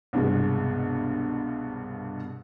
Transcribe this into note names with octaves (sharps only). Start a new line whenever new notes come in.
C2 G2 B2 G#3